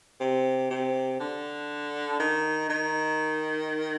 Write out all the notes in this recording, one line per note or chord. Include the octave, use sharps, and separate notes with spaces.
C3
C3
D3
D#3
D#3